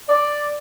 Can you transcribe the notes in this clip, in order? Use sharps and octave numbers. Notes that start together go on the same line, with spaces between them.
D5